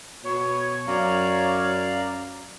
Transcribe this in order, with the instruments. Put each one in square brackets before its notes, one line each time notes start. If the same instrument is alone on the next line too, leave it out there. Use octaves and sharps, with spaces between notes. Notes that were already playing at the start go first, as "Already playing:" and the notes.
[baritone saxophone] B2 [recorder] C#5
[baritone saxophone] F#2 [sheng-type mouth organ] D5 F5 A#5